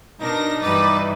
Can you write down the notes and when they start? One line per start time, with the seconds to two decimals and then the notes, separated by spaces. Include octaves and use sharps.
0.21 B2 D4 D#4 A#4 A#6
0.62 G2 E3 G3 B4 D6 A6